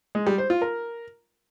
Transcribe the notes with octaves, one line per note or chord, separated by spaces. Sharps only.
G#3
G3
C5
F4
A#4